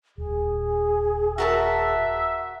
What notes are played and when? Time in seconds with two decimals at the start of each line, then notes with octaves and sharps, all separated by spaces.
0.18 D#1 G#4
1.38 F#4 A#4 E5 A5